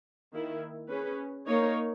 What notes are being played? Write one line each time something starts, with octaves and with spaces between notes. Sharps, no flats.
D#3 A#3 E4
C#4 G#4 B4
A#3 D#4 A#4 C#5